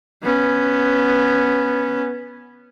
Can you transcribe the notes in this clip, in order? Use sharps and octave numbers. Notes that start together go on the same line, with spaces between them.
B3 C#4